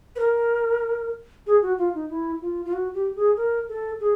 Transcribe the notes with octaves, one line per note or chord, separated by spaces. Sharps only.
B4
A#4
G#4
F#4
F4
D#4
E4
F4
F4
F#4
G4
G#4
A#4
A4
G#4